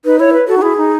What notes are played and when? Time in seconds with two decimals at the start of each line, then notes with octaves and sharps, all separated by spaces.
0.05 D#4 B4
0.19 E4 C#5
0.33 B4
0.48 F#4 A4
0.58 D#4
0.62 E4 G#4
0.77 D#4